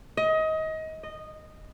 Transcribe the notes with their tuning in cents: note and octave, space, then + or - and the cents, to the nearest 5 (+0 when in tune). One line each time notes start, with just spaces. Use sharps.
D#5 +25
D#5 -10